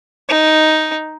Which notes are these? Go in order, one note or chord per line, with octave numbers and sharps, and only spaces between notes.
D#4